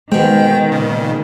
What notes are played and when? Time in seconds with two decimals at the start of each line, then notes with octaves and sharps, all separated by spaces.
0.12 G#2 B2 D#3 G#3 G5
0.72 A#2 C#3